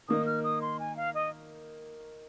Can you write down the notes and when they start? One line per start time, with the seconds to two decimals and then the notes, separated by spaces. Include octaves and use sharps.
0.08 D#3 A#3 D#4 D#6
0.26 F6
0.44 D#6
0.62 C6
0.80 G#5
0.97 F5
1.14 D#5